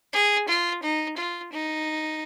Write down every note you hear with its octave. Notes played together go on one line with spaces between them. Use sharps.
G#4
F4
D#4
F4
D#4